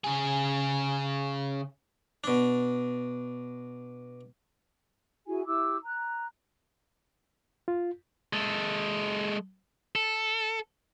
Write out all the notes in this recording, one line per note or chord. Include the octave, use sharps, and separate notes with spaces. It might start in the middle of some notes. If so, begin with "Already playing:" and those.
C#3 G#4
B2 D4
E4 F#4 G#4 G#5
E4 G4 D6 E6
A#5 F#6
F4
G#3 A4
A4